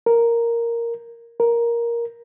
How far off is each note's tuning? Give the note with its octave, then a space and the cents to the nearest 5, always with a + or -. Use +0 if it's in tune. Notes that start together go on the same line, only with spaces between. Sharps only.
A#4 +0
A#4 +10